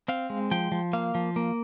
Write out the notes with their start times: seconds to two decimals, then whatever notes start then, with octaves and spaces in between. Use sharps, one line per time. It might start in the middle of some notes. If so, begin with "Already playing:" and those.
0.08 C4 F5
0.30 G#3
0.51 F3 G5
0.72 F3
0.93 A#3 F5
1.15 F3
1.36 A#3